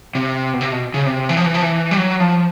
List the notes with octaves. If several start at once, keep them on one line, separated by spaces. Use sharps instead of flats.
C3
B2
C3
B2
C#3
C3
E3
F3
E3
F3
E3
G3
F#3
F3